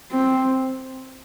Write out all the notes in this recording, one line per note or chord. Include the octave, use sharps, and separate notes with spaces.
C4